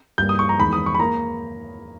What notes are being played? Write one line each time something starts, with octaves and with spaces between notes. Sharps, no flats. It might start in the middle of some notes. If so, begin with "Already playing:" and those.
G2 G3 A#3 G6
D#6
C#6
A#5
E2 D#3 G#3 B5
D#6
C#6
B5
A#3 A#5